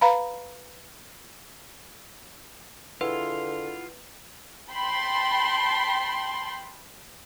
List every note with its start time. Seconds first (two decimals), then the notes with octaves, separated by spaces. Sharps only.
0.01 B4 F5 A#5 B5
3.01 D3 E4 F4 G#4 B4 F#5
4.71 G5 A5 B5 C6